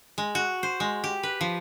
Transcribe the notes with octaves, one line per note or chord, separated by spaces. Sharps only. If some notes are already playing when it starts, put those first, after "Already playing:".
G#3
F#4
C5
G#3
G4
B4
F3